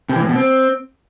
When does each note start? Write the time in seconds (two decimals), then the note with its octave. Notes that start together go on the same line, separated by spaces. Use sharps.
0.09 C3
0.16 E3
0.22 A2
0.29 B2
0.35 C4